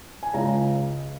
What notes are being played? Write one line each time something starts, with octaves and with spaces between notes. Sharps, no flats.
G#5
C#2 C#3 G#3 A#5